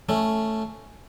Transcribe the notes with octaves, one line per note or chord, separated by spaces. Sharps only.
A3 C#4